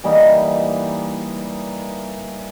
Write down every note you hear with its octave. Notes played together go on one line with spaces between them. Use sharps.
E3 G3 A#3 D#4